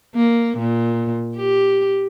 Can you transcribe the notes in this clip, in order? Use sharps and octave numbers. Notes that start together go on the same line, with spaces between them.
A#3
A#2
G4